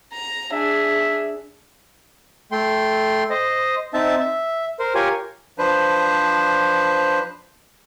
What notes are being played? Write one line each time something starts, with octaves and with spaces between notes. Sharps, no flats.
A#5
D4 G#4 E5
A3 G5 C6
C5 D#5
C4 D#4 E5 A5
E5
A#4 C5
F4 G4 A#4 C#5 G#5
F3 D4 B4 C5